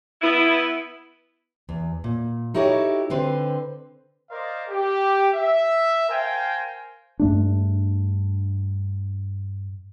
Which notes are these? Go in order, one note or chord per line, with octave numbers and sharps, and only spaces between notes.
B3 E4
E2
A#2
D#4 E4 F#4 G4 A4 C#5
D3 C4 B4 C5
A#4 C5 D5 D#5 F5
G4
E5
A#4 C5 F5 G5 G#5
G2 A3 D4